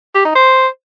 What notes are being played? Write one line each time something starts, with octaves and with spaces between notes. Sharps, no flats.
G4
D#4
C5